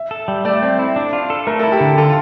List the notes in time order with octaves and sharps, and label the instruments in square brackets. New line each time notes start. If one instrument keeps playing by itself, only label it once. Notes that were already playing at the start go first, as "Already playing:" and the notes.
Already playing: [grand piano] E5
[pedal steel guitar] A4
G3
[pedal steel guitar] A3 [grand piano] D5
[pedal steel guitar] C4
E4
D4
F4
A4
[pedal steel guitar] A3 [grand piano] A#4
[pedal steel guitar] E4 [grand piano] A4
[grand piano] G4
[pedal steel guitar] D3
[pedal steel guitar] F4 [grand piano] A4